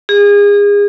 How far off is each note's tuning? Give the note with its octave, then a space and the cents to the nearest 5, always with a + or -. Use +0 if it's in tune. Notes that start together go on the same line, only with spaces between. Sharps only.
G#4 -30